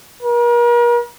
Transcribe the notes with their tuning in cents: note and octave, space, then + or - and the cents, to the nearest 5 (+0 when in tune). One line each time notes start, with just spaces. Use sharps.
A#4 +40